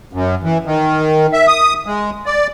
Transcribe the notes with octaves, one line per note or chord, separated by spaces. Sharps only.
F#2
E3
D#3
E5
D#6
G#3
D5